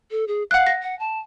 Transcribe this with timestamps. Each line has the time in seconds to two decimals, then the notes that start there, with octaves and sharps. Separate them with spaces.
0.11 A4
0.28 G#4
0.51 F5 F#5 F#6
0.67 A#6
0.82 F#5
0.99 A5